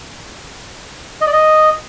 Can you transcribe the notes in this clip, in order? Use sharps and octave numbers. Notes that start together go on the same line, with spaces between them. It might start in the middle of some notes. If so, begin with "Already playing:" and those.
D#5
D5
D#5